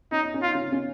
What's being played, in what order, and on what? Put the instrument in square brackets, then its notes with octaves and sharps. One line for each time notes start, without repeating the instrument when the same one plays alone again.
[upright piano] C#4 [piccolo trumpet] D#4
[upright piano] D#4
C#4
[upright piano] D#4 [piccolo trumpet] F4
[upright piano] C#3 C#4
C#3 C#4